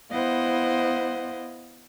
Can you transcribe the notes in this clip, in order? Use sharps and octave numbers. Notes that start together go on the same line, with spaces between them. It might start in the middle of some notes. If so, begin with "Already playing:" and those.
B3 E4 C5 D#5 F5 F#5